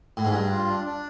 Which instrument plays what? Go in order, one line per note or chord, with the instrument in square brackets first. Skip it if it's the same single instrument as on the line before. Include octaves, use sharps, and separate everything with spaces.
[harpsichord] A2
G#2
[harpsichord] G2 [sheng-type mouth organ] D4
[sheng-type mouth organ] F4
D4
D4